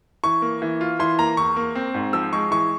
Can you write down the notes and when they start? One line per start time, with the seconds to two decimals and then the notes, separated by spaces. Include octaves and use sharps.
0.24 E3 C#6
0.42 A#3
0.62 E3
0.81 F4
0.99 E3 C6
1.19 A#3 A#5
1.37 E2 C#6
1.56 A#3
1.75 C4
1.94 G#2
2.13 F3 E6
2.33 G#3 C#6
2.51 E3 C#6